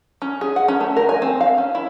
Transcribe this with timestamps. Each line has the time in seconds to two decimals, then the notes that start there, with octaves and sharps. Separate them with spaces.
0.22 C#4
0.41 G#4
0.56 F#5
0.68 C#4
0.80 A3
0.96 A#4
1.09 G#5
1.22 C4
1.41 F5
1.58 C#4
1.75 E4